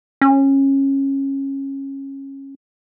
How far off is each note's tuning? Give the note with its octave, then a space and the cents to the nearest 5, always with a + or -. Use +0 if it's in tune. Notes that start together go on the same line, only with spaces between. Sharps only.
C#4 -20